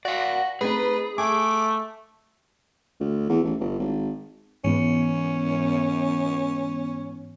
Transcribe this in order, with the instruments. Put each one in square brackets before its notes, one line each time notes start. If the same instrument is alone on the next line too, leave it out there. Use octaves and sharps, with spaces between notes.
[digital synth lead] F#4 [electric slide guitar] D5 F5
[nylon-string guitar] A3 C4 D#4 [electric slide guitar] G#4 [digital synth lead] B4
[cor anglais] A3 [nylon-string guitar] G#5 [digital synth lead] D6
[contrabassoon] D2
E2
A1
G1
G#1
[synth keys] G#2 E3 B3 [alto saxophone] C#4